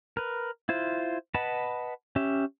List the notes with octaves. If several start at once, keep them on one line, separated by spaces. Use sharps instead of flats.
A#4 B4
E4 F4 C5
B4 D#5 F#5 A5 B5
C#4 G4 E5